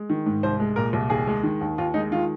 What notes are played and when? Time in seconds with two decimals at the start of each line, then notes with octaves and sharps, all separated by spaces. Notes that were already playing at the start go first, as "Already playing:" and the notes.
Already playing: G#3
0.10 D#3
0.26 G#2
0.43 C2 C5
0.60 G#3
0.76 A#2 A#4
0.93 C2
1.10 D#2 G#4
1.27 G#3
1.43 D#3
1.61 D#2
1.78 D#2 F4
1.94 G#3 D#4
2.12 D#3 F4